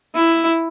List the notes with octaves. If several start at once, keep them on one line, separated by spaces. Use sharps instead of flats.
E4